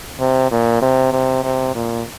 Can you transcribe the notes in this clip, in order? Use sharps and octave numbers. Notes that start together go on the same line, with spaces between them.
C3
A#2
C3
C3
C3
A#2